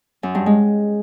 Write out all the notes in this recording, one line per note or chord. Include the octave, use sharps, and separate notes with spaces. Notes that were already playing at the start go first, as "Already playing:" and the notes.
F#2
G2
G#3